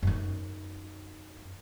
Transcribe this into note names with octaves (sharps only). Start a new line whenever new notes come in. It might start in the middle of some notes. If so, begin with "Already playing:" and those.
F#2 D#4